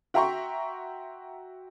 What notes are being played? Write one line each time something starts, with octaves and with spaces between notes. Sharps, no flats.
F#4 E5 G5 A#5 C6 C#6